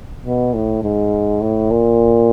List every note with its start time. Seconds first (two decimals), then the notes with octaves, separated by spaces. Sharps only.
0.25 B2
0.54 A2
0.83 G#2
1.41 A2
1.71 A#2